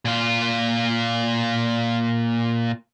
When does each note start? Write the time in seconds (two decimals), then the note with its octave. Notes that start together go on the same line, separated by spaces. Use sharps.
0.05 A#2 F4